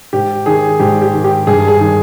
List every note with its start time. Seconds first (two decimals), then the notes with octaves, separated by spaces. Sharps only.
0.13 G#2 G4
0.46 D#3 G#4
0.80 G#2 G4
1.01 G4
1.13 D#3
1.24 G4
1.47 G2 G#4
1.68 G#4
1.80 D#3